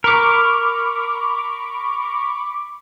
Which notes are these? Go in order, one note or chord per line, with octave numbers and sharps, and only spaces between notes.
A#4 B5 C#6 D6